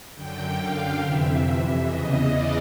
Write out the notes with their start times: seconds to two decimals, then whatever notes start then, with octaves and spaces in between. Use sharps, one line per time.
0.15 F#2 D3 G5
0.58 F5
1.01 F2 C3 E3 E5
1.84 E2 C#3 E3 D#5
2.27 D5